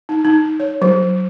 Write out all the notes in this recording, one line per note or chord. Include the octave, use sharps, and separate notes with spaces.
D#4
D#4
C#5
F#3